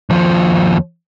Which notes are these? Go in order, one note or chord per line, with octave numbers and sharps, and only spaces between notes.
D#2 F3